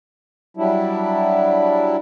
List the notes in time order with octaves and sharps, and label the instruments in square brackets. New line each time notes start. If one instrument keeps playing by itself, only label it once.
[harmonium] F#3 G3 D4 E4